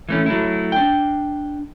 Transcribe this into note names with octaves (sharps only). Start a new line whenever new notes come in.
E3 A3 C#4
F#3 A3 E4
D4 G5